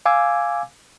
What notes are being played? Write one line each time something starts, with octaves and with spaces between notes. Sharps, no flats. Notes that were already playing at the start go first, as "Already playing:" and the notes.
F5 G#5 D6 E6 G#6